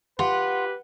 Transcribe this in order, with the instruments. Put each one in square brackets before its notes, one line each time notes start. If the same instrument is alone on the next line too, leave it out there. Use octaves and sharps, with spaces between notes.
[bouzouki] F4 [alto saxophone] G4 [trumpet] B4 [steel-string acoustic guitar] F#5